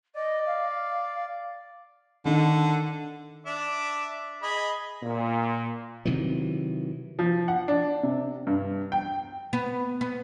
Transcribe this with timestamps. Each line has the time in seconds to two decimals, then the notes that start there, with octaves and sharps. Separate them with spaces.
0.15 D5 D#5
0.46 F5
2.25 D3 D#3
3.46 D4 E5 D6
4.43 G#4 D#5 B5
5.03 A#2
6.05 C3 D#3 E3 F#3
7.19 F3
7.48 F#5
7.68 D4
8.03 C3
8.47 G2
8.92 G5
9.53 B3
10.01 B3